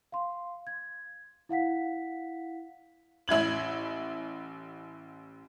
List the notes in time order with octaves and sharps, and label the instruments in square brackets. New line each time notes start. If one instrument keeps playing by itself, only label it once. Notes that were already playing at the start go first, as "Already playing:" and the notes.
[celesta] F5 C6
G#6
E4 F5 F#5 B6
[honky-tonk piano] A1 E4 G#6 F#7